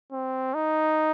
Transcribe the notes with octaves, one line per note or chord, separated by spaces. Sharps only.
C4
D#4